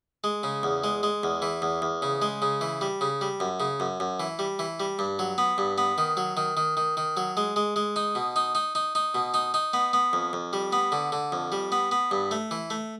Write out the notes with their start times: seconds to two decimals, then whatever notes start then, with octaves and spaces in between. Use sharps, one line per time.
0.24 G#3
0.43 C#3
0.63 E2
0.84 G#3
1.03 G#3
1.23 E2
1.42 E3
1.62 E2
1.82 E2
2.02 C#3
2.22 G#3
2.42 C#3
2.61 E3
2.81 G3
3.01 C#3
3.21 G3
3.40 F#2
3.60 C#3
3.80 F#2
4.00 F#2
4.20 E3
4.39 G3
4.59 E3
4.80 G3
4.99 G2
5.19 F#3
5.38 B3
5.58 G2
5.78 B3
5.98 D#3
6.17 F#3
6.37 D#3
6.57 D#3
6.77 D#3
6.97 D#3
7.17 F#3
7.37 G#3
7.56 G#3
7.76 G#3
7.96 D#4
8.15 B2
8.36 D#4
8.55 D#4
8.75 D#4
8.95 D#4
9.15 B2
9.34 D#4
9.54 D#4
9.73 B3
9.93 B3
10.13 F2
10.33 F2
10.53 G3
10.73 B3
10.92 D3
11.12 D3
11.32 F2
11.52 G3
11.72 B3
11.91 B3
12.11 G2
12.31 A3
12.51 E3
12.70 A3